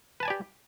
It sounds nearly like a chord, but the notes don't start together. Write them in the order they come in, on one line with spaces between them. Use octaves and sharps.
B4 A5 G#5 D5 G4